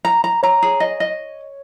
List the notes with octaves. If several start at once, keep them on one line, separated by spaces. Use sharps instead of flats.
A#5
A#5
C#5 A#5
G#4
D#5
D#5